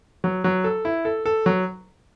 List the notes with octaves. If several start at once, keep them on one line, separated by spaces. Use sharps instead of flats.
F#3
F#3
A4
E4
A4
A4
F#3